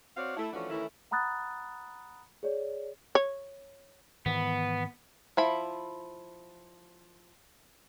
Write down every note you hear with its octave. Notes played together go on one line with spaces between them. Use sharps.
C4 F#4 C#5 D5 F5
A3 E4
E3 F3 A3 C#4 D4 F#4
D#3 E3 A3 C#4 E4
F#5 A#5 B5 D#6 F#6 A6
G#4 C#5 D5
C#5
G#2 D#3 E3 B3
F3 E4 B5